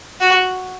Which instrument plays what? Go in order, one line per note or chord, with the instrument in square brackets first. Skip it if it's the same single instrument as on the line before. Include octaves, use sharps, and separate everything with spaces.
[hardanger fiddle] F#4